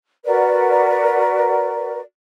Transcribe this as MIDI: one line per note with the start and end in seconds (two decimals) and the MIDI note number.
0.25 2.00 66
0.25 2.00 70
0.25 2.00 71
0.25 2.00 74